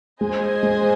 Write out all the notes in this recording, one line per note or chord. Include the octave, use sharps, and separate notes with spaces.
G#3 G#4 C5 D#5 G#5
G#3